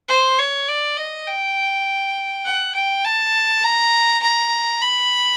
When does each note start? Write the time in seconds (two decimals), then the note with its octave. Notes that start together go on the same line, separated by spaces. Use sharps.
0.09 C5
0.38 C#5
0.68 D5
0.97 D#5
1.27 G5
2.45 F#5
2.75 G5
3.05 A5
3.63 A#5
4.22 A#5
4.81 B5